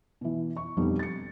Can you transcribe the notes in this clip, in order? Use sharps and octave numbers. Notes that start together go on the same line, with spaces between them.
B2 E3
C#6
F2 B2 D3 G3 D#4
A6 C#7